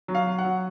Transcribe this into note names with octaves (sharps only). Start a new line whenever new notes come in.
F#3
F5
F#3
F#5
F#3